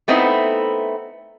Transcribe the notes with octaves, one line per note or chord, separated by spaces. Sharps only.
A3 B3 C4 D#4 E4